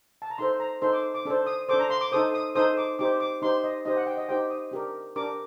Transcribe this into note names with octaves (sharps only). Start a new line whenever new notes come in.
A5
A#5
D#4 A4 C5 C6
A#5
D#4 A4 C5 C6
D6
D6
D4 A4 C5
D#6
D4 A4 C5 D6
A#5
C6
D6
D#4 A4 C5 D#6
D#6
D#4 A4 C5 D#6
D6
D#4 G4 C5 D6
D6
D#4 G4 C5 C6
D#5
D#4 G4 C5 D#5
F#5
G5
D#5
D#4 G4 C5 G5
D#6
D4 G4 A#4
D4 G4 A#4 D6